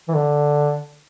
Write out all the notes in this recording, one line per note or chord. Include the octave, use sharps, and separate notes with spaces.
E3
D3